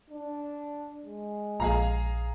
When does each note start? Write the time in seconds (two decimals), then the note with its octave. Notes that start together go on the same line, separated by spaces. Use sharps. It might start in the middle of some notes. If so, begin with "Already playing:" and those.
0.10 D4
1.05 G#3
1.60 A#1 G#4 F5 A#5